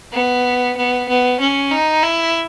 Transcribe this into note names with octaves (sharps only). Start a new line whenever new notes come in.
B3
B3
B3
C#4
D#4
E4